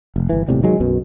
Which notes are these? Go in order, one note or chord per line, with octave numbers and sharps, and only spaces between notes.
F1
G1 E3
D#1 A2 C3 G3
D#3 F#3 G#3
B1 F#2 B2